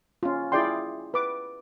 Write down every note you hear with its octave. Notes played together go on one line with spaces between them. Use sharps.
C#4 F4
E4 F4 G#4 D5 G5 C6
B4 D6